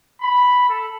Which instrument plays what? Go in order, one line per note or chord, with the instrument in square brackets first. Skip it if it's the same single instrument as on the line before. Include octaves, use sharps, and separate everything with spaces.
[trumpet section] B5
A4